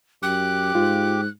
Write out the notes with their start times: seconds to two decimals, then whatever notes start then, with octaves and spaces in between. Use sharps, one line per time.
0.23 F#2 G4 D6 F#6
0.75 G#2 F4